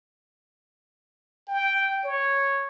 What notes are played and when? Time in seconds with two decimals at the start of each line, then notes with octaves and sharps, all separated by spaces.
1.48 G5
2.04 C#5